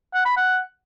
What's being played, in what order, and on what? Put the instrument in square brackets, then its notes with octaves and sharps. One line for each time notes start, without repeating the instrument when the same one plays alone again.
[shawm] F#5
B5
F#5